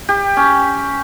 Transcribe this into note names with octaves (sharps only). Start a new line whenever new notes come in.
G4
C#4